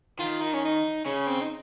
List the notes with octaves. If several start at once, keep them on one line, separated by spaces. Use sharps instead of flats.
D#3 F4
D#4
C#4
D#4
C#3 C#4
C4
D#4